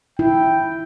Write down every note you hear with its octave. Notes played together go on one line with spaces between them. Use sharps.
E4 G5